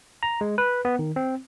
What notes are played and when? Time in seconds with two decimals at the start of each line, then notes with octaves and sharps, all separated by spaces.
0.23 A#5
0.41 G#3
0.58 B4
0.85 B3
0.99 D#3
1.16 C4